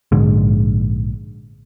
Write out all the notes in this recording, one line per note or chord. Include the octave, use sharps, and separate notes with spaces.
A#1 G#2 D3 G#3